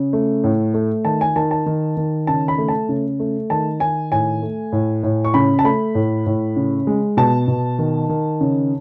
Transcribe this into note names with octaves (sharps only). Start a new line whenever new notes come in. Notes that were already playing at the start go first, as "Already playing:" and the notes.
Already playing: C#3
A3
A2
A3
D#3 A5
G#5
D#3 A5
A5
D#3
D#3
C#3 A5
B5
A3
A5
C#3
A3
D#3 A5
D#3 G#5
A2 G#5
A3
A2
A2
C#6
C#3 B5
A5
A3 B5
A2
A2
C#3
G#3
B2 A5
B2
D#3
D#3
C#3